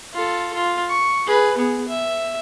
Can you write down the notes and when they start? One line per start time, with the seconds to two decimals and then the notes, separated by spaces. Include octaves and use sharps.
0.14 F4 A4
0.54 F4
0.89 C#6
1.27 G#4 B4
1.57 B3 G#4
1.88 E5